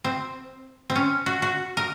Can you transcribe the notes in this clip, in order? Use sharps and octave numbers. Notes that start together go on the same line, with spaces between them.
C4
C4
C#4
F#4
F#4
A#4